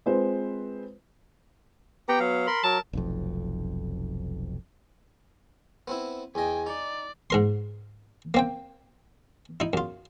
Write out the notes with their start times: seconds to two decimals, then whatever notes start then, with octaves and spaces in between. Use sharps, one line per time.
0.06 G#3 C4 F4 B4 C5
2.09 B3 G4 G5 A#5
2.20 F#3 F5
2.47 A#4 B5 C6
2.64 F#3 A#4 A5
2.93 F1 B1 F2
5.88 B3 C4 E4
6.35 E2 D#5 G5 G#5
6.67 D#4 D5
7.30 G#2 A#4 C6
8.34 A#3 C4 G5
9.60 D#4 E4
9.73 F#2 F4